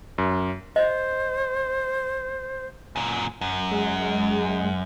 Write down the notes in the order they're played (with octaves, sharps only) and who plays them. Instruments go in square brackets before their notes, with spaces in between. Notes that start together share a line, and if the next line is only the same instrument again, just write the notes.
[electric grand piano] F#2
[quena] C5 [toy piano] D#5
[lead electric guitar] F#2 A#2
F#2
[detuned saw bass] G#3